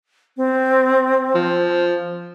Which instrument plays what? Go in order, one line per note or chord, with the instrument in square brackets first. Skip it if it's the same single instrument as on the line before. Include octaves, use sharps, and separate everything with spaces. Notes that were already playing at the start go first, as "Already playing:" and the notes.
[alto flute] C4
[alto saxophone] F3